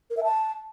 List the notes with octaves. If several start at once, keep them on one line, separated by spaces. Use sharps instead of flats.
A#4
E5
A5